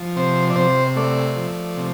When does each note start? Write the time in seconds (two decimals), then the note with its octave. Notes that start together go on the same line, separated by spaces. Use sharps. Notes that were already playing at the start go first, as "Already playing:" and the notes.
Already playing: F3
0.16 C3 C5
0.50 D5
0.56 C3 C5
0.96 A3 D5
1.36 F3
1.76 C3